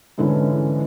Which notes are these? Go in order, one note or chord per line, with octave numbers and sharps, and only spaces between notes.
G#2 D3 E3 C#4